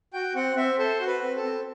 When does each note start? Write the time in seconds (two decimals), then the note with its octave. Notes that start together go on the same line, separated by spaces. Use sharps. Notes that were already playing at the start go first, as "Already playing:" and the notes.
0.13 F#4 G5
0.35 C4 F#5
0.56 C4 E5
0.78 A4 C5
1.00 F#4
1.07 B4
1.22 C4
1.36 A4
1.43 C4